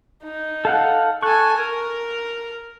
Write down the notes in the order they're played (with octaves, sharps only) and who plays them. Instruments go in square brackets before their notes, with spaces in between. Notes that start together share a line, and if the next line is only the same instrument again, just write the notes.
[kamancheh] D#4
[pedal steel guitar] A4 F5 F#5
[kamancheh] A4 G#5 [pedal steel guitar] C#6 F#6
[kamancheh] A#4